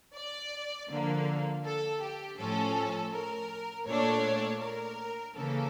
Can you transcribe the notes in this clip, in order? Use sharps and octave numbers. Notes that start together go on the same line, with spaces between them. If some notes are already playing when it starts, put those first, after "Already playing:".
D5
D3 F3 A#3
A4
G4
A2 F3 C#4 A4
A#4
A#2 A3 D4 C#5
A#4
C#3 E3 A#3 A4